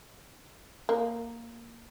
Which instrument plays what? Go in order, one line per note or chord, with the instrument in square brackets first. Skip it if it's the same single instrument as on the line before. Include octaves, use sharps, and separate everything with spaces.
[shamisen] A#3